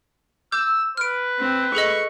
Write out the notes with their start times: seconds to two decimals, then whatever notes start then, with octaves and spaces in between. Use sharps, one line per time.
0.52 D6 E6 G6
0.97 B4 F6 D7
1.39 C4
1.75 G#4 A4 D#5 C#6